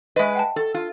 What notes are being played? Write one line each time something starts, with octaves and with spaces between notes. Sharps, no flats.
G#3 B4 D#5 E5
F#5 G5 A5
A4
F4